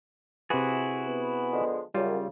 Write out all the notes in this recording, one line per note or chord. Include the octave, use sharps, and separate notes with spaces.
C3 E4 F#4 G#4 B4
B3
D3 F3 G#3
F#2 C#3 G3 F4